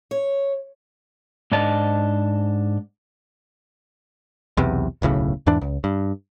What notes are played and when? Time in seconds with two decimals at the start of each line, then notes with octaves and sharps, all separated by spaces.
0.11 C#5
1.52 G#2 D4 D#5 A5
4.57 B1 E2 C3
5.02 D1 B1 A2 C#3
5.47 E2 G#2 E3 D4
5.61 C#2
5.84 G2